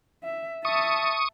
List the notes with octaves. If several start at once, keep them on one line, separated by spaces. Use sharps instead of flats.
E5
E5 A5 C#6 D#6